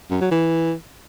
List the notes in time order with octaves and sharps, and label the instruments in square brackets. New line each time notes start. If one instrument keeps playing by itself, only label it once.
[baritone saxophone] F#2
F#3
E3